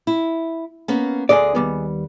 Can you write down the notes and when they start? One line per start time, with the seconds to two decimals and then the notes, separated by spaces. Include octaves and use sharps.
0.07 E4
0.88 A#3 B3 C#4
1.29 D2 D3 G#4 D5 D#5 G#5
1.55 D#2 G3 B3